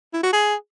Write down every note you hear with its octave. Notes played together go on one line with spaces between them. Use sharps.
E4
F#4
G#4